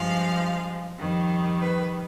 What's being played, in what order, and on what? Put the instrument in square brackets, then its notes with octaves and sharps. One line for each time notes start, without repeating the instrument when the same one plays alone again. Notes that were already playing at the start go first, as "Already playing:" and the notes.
Already playing: [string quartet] G2 F3 G#3 F5
F2 D#3 G3
B4